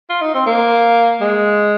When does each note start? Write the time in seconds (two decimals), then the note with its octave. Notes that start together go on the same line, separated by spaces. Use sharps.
0.10 F4
0.21 D#4
0.34 C4
0.46 A#3
1.21 G#3